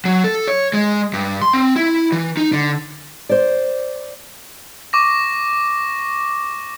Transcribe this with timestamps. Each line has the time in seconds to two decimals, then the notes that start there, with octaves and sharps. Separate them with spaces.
0.05 F#3
0.24 A4
0.47 C#5
0.74 G#3
1.13 G2
1.42 C6
1.53 C4
1.76 E4
2.12 E3
2.37 D#4
2.53 D3
3.29 C5 D5
4.93 C#6 D6 A#6